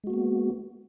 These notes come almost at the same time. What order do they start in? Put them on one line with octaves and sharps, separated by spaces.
G#3 F#4 A#3 B3